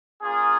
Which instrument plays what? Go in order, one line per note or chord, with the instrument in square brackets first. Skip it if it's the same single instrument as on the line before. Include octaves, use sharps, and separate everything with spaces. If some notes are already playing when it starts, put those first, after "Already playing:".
[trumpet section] A#3 C#4 F4 G#4